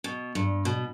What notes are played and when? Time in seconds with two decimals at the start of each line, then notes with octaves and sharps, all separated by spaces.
0.04 B2
0.35 G2
0.65 B2